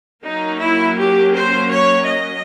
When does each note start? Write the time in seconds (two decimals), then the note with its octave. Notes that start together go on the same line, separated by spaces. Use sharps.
0.23 F#3 A#3 C#4 D#4
0.59 E4
0.96 G4
1.32 C5
1.69 C#5
2.05 D#5